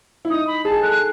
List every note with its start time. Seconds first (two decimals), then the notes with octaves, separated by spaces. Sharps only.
0.25 E4
0.30 D#4 D#6
0.47 B5
0.65 G#4 A5
0.82 A4 F#6